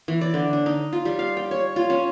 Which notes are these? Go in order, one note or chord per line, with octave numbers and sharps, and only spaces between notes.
E3
D5
D3
D4
D#4
F4
G3
F5
G5
C#5
F4
C#4